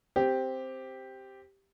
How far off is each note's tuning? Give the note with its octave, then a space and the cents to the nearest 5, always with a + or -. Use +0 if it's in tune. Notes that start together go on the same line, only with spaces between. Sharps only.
C4 +0 G4 +0